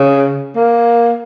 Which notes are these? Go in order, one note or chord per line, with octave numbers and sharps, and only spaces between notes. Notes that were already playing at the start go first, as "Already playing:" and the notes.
Already playing: C#3
A#3